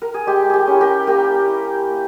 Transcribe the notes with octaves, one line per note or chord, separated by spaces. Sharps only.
A#4
G#4
G#3 G4
G4 G#4
C#4 E4
G4 A#4
A#3 G4 A#4
E4
A#3